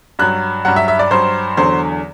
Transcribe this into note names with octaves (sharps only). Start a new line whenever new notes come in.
G2 F#3 F#6
G2 F#3 F#5
E5
E5
D5
G2 F#3 C5
E2 D3 F#3 C5